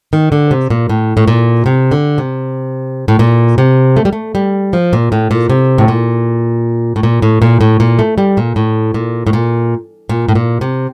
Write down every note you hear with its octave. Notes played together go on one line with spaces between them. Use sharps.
D#3
D3
C3
A#2
A2
A2
A#2
C3
D3
C3
A2
A#2
C3
A3
G3
A3
G3
F3
A#2
A2
A#2
C3
A2
A#2
A2
A#2
A2
A#2
A2
A#2
A3
G3
A#2
A2
A#2
A2
A#2
A#2
A2
A#2
C3